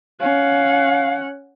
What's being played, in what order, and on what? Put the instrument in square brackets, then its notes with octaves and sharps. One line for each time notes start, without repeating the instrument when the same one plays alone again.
[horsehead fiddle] C#4 F#5 [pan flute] F5